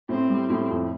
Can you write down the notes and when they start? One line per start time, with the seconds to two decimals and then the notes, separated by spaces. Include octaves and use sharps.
0.09 A2 C4
0.29 G3
0.50 A2
0.70 F2